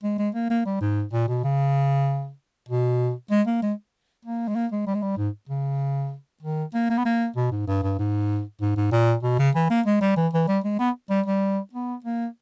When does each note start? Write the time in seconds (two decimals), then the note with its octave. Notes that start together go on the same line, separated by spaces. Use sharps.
0.03 G#3
0.18 G#3
0.35 A#3
0.50 A#3
0.66 G3
0.81 G#2
1.13 A#2
1.28 B2
1.44 C#3
2.69 B2
3.31 G#3
3.47 A#3
3.62 G#3
4.25 A#3
4.48 G#3
4.56 A#3
4.72 G#3
4.87 G3
4.95 G#3
5.02 G3
5.18 G#2
5.49 C#3
6.42 D#3
6.74 A#3
6.90 A#3
6.98 B3
7.06 A#3
7.36 B2
7.52 G#2
7.67 G2
7.83 G2
7.99 G#2
8.61 G#2
8.77 G#2
8.92 A#2
9.23 B2
9.39 C#3
9.55 E3
9.70 A#3
9.86 G#3
10.01 G3
10.17 E3
10.33 E3
10.48 G3
10.64 G#3
10.79 B3
11.10 G3
11.26 G3
11.73 B3
12.04 A#3